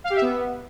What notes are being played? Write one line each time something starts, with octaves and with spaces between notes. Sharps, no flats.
F5
G4
E5
B3